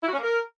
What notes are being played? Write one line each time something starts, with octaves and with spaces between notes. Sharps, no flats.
E4
F#4
C#4
A#3
A#4